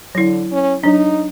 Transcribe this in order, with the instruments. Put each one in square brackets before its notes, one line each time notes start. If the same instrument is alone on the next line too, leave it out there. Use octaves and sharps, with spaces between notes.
[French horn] D3 [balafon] F#3 E4
[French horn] C#4
[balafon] F#3 D4 [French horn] D#4